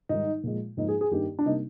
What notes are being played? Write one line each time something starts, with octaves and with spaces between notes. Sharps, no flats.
G#2 D#3 G3 D#4
A#2 F3 G#3
G#2 F3 A#3 D#4
G#4
G#4
G2 D#3 A#3 G4
D4
C3 G3 A#3 D#4